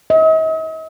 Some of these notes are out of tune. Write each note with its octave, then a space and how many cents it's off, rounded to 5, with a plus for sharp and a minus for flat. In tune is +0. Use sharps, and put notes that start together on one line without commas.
D#5 +45